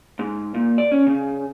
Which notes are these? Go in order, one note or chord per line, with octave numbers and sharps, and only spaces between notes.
G#2
A#2
D5
C#4
C#3